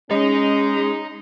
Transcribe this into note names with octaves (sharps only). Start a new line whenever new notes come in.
G#3 C#4 D#4